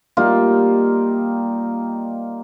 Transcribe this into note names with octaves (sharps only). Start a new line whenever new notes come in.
G3 A#3 D#4 F4